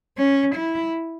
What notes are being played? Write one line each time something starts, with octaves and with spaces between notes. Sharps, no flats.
C#4
E4